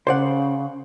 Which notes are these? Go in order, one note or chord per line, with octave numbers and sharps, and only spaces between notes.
C#3 C5 D5 F#5